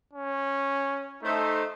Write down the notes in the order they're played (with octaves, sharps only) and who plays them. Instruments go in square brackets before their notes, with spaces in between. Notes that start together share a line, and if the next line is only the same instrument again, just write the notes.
[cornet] C#4
[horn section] A3 C5 [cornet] D#4